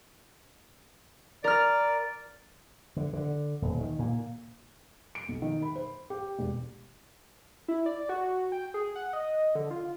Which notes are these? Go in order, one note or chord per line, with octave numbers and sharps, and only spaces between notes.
A#4 D5 F6
D3
D3
D#1
D#3
A#2
D7
B1
D#3
B5
C5
G4
E1
E4
D5
F#4
G5
G#4
F#5
D#5
D3
F4